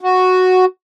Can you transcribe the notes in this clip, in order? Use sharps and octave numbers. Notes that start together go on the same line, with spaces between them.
F#4